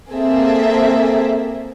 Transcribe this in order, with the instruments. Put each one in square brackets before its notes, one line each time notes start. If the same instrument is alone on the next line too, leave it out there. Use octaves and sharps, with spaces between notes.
[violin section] A#3 C4 G#4 A4 E5